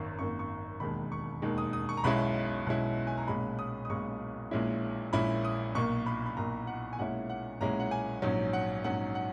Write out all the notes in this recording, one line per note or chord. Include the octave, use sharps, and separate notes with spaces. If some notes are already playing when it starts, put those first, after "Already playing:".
Already playing: G#1 F#2 D#3 A#3 C#6
G#1 F#2 D#3 A#3 C#6
C#6
E1 D#2 D#3 G#3 B5
C#6
E1 D#2 D#3 G#3
D#6
D#6
C#6
A#5
B1 B2 G#3 C#4 E4 B5
B1 B2 G#3 C#4 E4
G#5
A#5
B1 A#2 G#3 C#4 B5
D#6
D#6
B1 A#2 G#3 C#4 C#6
A#1 A#2 G#3 C#4 E4
A#1 A#2 G#3 C#4 E4 B5
D#6
B1 A#2 A#3 C#6
B5
B5
B1 A#2 A#3 A#5
F#5
G#5
B1 A#2 G#3 C#4 E4 F#5
F#5
B1 A#2 G#3 C#4 E4 A#5
F#5
G#5
A#1 G#2 F#3 C#4
F#5
A#1 G#2 F#3 C#4 F#5
F#5